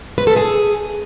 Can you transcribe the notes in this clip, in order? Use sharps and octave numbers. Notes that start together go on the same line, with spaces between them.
B4
A4
G#4